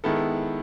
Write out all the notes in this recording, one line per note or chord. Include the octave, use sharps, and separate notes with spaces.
D#3 G#3 B3 E4 A4